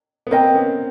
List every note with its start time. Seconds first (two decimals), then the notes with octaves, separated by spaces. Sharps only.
0.27 B3
0.31 A#3 C4 A#4 D#5 G5
0.54 B3 C#4